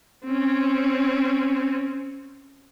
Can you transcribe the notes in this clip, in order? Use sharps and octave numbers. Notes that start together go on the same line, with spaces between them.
C4 C#4